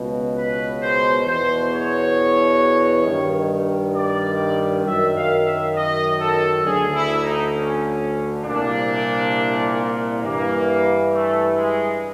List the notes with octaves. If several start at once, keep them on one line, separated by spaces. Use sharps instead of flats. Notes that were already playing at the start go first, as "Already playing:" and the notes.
Already playing: C#2 B2
B4
C5
E2 B2 C5
C#5
G2 D#3
D5
F#2 D#3 E5
F5
E5
D#5
A4
D2 D3 G#4
E4
D#4
C#4
C2 A#2 D4
G2 E3 A#3
A3
G#3